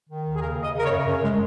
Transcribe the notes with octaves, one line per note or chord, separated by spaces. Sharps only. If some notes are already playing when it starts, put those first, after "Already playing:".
D#3
D#2
G#4
C#3 A#4
C#3 D#5
C#3 A#4
C#5
F#2
F#2 A#4
G#3